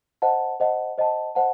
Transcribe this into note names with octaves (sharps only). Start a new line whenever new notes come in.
C5 D#5 F#5 A5
C5 D#5 F#5 A5
C5 D#5 F#5 A5
C5 D#5 F#5 A5